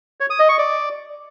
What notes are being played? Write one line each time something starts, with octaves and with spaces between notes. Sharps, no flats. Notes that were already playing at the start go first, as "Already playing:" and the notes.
C#5
D#6
D#5
C#6
D5